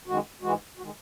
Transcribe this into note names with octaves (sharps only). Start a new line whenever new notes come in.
F#2 D#3 G#3 F#4
G#2 E3 G#3 F#4
D#3 G#3 F#4